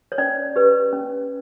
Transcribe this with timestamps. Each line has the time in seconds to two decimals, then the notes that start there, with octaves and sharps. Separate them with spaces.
0.12 C#5
0.18 C#4 D5
0.56 G4 B4
0.93 C#4